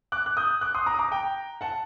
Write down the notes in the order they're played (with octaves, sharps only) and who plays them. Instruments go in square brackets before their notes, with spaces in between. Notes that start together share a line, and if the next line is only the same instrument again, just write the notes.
[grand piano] D6 F#6
F#6
D#6 G6
D6 F#6
C6 D#6
A#5 D6
D#6
A#5 D6
G5 A#5
F#5 A5